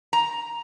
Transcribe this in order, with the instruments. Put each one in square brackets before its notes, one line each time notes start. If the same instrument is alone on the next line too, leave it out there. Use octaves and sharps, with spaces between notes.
[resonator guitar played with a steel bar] A#5